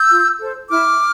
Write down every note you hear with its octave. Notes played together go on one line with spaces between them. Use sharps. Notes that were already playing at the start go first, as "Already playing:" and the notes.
Already playing: E6 G6
F4
A4 C5
E4 D6 F6